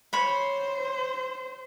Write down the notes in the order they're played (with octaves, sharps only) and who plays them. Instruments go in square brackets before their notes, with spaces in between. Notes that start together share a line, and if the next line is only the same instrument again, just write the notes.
[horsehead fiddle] C5 [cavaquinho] C#5 B5